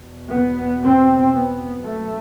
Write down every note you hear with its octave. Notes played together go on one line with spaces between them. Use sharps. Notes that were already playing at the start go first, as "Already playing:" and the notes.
Already playing: E2 B2
B3
C4
B3
F#2 A3